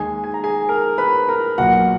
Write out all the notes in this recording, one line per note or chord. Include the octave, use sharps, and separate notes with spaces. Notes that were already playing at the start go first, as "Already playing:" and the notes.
Already playing: D#2 D#3 G#3 G#4 G#5
G#5
A#5
G#4 G#5
A#4 A#5
B4 B5
A#4 A#5
B1 A#2 F#3 F#4 F#5